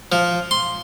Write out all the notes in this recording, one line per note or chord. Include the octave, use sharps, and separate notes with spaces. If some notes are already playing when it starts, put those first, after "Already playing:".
F3
C6